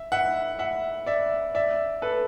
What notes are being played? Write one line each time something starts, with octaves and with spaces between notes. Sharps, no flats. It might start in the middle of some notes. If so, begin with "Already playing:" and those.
Already playing: E5
E5 F#5
E5 F#5
D5 E5
D5 E5
A4 B4